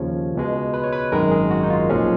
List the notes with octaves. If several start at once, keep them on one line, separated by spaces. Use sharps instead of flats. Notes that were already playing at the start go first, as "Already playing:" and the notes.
Already playing: D#2 C#3 F3 C#5
C#2 B2 G#3
B4
C#5
B4
G#1 F#2 D#3 G#3 A#4
G#4
F#4
D#4
F4
B1 A#2 F3 G#3 C#4